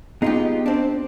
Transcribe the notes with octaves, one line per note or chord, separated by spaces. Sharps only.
B3 D#4 F4 G4 G#4 D#5
C4 D4